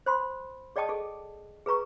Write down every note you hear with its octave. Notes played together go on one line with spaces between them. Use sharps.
C5 B5 C6
G#4 D5 D#5 G5 A5 D#6
G#4 A4
G#4 B4 A#5 C#6